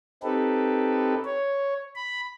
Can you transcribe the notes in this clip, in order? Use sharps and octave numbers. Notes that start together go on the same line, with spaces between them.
C4 D#4 G4 A4 B4
C#5
B5